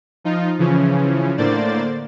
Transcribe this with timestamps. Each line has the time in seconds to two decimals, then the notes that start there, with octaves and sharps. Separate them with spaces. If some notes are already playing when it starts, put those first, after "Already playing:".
0.24 F3 D#4 F4
0.59 C#3 E3 F3 C#4
1.38 A2 D3 A#3 C5 D5 A6